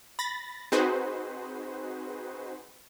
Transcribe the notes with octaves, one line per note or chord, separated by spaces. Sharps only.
B5 A6 A#6
C4 D#4 F#4 G#4 B4 C5